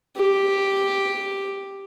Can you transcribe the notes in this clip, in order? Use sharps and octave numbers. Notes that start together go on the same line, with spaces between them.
G4